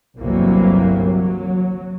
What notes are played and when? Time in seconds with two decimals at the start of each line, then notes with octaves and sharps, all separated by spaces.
0.17 G1 C2 C3 E3 F#3 A#3
1.00 F#3